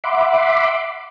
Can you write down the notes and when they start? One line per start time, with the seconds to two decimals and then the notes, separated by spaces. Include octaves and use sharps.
0.04 E5 F#5 B5 C6 D6